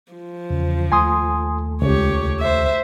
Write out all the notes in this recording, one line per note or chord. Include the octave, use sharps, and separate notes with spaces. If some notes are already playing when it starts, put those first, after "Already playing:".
F3
E2 C#3
D#2 A3 G#5 C6 D#6
C#2 G4 C#5
C5 E5